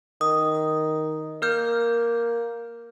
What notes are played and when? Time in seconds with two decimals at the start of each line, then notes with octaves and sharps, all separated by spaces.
0.21 D#3 D#6
1.42 A#3 A#4 F6 G6